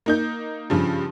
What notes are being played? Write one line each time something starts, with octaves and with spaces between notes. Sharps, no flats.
A#3 D#4 G6
G2 C#3 F3